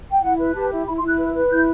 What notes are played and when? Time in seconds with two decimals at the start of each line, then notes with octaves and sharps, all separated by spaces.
0.10 G5
0.22 E4 F#5
0.38 B4
0.54 G4 A5
0.71 E4
0.86 E4 B5
0.98 C6
1.02 E4
1.08 F#6
1.19 B4
1.35 B4
1.51 E4 G6